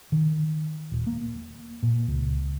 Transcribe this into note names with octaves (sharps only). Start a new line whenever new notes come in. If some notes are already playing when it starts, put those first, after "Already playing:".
D#3
D#1
A#3
A#2
C#2